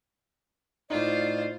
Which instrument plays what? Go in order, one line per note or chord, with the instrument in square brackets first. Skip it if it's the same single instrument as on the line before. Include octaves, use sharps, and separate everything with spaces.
[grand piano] A2 D#4 [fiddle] F4 C5 [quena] D5